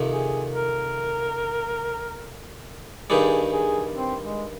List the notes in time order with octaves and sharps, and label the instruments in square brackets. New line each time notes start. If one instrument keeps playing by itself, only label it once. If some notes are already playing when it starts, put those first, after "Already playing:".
Already playing: [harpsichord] F2 C3 D#3
[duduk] G#4
A#4
[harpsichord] G2 D#3 G3 [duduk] G#4
[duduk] G#4
C4
G#3